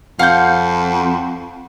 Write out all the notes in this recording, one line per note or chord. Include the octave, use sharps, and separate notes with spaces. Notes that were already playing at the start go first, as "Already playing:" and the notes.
F2 F5 F#5 G6